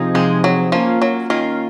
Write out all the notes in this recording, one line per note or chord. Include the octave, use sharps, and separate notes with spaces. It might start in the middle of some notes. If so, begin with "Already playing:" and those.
Already playing: C3 F3 C4 D#4 G#4
C3 F3 G#3 C4 D#4 G#4
F#3
F3 A#3 C#4 F4
F#3
D#3 A#3 C#4 F4